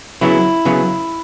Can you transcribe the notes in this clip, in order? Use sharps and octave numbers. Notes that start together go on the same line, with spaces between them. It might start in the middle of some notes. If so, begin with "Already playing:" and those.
C#3 F#3 B3 E4
C#3 F#3 B3